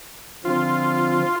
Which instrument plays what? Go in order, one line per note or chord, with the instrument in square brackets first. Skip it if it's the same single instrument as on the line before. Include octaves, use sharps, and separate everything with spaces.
[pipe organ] D3 F3 C4 [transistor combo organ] F4